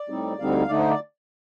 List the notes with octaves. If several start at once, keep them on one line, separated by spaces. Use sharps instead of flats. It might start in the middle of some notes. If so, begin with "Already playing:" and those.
Already playing: D5
A2 G3 C4 D#4
D2 D3 G3 C4 D#4 F5
D3 A3 D#4 D5
C5
D5